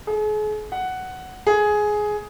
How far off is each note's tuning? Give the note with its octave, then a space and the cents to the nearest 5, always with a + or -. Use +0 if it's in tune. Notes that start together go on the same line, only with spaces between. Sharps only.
G#4 +40
F#5 +5
G#4 +10